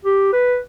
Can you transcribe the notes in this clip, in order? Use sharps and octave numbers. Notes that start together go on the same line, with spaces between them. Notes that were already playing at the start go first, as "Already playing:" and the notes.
G4
B4